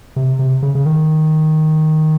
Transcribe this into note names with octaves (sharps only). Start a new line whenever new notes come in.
C3
C3
C#3
C#3
D#3